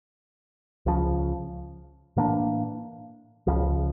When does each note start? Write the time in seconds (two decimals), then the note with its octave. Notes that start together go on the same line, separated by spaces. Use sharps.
0.86 C#2 C#3 F3
2.16 A2 E3 A#3 D4
3.47 C#2 C#3 F3